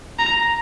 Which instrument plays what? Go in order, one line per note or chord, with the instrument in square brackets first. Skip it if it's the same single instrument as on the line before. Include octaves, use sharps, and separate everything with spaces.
[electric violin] A#5